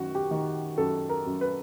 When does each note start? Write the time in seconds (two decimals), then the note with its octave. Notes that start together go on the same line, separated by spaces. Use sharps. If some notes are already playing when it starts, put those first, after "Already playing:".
Already playing: F#2 D#3 F#4
0.15 G4
0.31 D#3
0.78 F#2 A4
1.10 A#4
1.26 F#2
1.41 B4